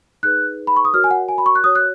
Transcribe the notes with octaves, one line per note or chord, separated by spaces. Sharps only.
D#4 G#4 B4 F#6
B5
C#6
D#6
F#4 A#4 C#5 F6
G#5
F#5
G#5
B5
C#6
F#6
F#4 C#5 D#6
F#6